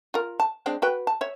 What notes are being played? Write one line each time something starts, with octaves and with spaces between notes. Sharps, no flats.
F4 A#4
A5
G#3 C4 D4
F#4 B4 G5
A5
C#5 E5